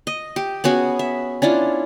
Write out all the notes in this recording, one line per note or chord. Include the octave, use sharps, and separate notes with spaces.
D#5
G4
B3 C#4 F#4 G#4
E5
C#4 D4 E4 F4